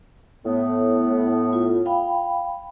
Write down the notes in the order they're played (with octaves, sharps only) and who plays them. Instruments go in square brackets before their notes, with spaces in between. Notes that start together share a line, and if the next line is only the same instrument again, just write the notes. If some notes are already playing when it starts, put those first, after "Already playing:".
[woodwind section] A2 B3
[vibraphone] F4
F5 G5 B5